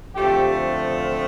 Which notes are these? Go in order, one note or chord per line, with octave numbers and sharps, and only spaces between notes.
D3 F3 A3 C4 G4